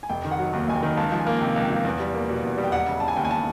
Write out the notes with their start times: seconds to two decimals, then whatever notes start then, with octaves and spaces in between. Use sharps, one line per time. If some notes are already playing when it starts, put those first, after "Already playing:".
0.03 G#5
0.09 F1 G5
0.25 D#3
0.31 F#5
0.39 F#3
0.53 D#2
0.68 F1 G#5
0.75 G5
0.83 D#3
0.97 C#2 A5
1.12 F3 A5
1.20 G#5
1.27 A#3
1.40 C3 G5
1.56 C#2
1.62 G5
1.70 F3
1.85 E2
1.99 G3
2.14 A#3
2.29 B2
2.44 E2
2.58 G3
2.64 G5
2.72 E1 F#5
2.87 C#3
3.00 E1 A5
3.08 G#5
3.16 D#2 G5
3.25 G#5
3.31 A5